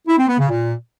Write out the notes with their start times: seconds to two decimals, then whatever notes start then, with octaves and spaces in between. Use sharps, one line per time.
0.07 E4
0.18 C4
0.28 B3
0.39 C#3
0.49 A#2